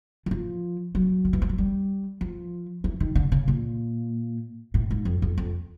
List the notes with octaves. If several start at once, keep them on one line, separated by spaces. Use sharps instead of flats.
E3
F3
F#3
D#3
E3
F3
F#3
G3
F3
E3
D#3
D3
C#3
A#2
A2
G#2
F2
F2
F2